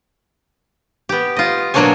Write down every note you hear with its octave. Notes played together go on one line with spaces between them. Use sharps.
B3 G4
F4 D#5
B2 F#3 A#3 D4 C#5 G#5